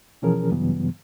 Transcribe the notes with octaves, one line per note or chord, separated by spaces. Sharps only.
B2 E3 F3 C#4 G#4 A#4
G2 C#3 E3 F#3 G3 B3